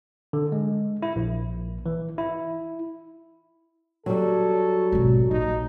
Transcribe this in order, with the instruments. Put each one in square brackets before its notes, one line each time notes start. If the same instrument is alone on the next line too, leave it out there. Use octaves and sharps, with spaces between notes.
[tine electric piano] D3
G#3
E4
A#1
E3
E4
[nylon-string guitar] F#3 G3 [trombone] A4
[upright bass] G#1 B2
[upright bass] A#1 [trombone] D#4